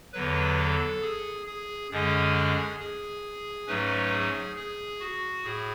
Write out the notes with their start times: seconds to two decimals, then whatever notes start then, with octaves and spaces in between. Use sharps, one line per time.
0.13 E2 D3 F#3 B4
0.58 A4
1.02 G#4
1.46 G#4
1.91 F#2 D3 G#3 C#4 G#4
2.79 G#4
3.67 G#2 F#3 A3 C#4 B4
4.12 G#4
4.56 G#4
5.00 F#4
5.44 A2 G#4